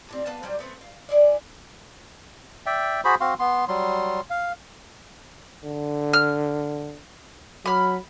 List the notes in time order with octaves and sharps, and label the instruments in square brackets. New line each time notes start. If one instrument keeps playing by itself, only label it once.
[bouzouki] A2 G3 C4
B3 B4 F5 A5
F#3 G3 C5 D5
A3 B3 C4
F5
E4 G#4 D5
[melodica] D5 E5 G5
F#4 G#4 C5 B5
C4 F#4 F5 C6
B3 C6
F#3 G3 C6
F5
[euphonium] D3
[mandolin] F6
[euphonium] F#3 [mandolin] B5 F6